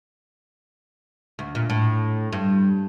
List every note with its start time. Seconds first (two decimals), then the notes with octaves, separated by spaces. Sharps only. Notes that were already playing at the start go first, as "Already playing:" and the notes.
1.39 D2
1.55 A#2
1.70 A2
2.32 G2